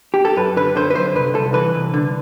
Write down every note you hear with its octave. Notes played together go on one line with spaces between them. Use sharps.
G4
A4
F#2 B4
D3 B4
D3 C5
B4
F#2 C5
C2 B4
C2 A4
E3 B4
C2
D3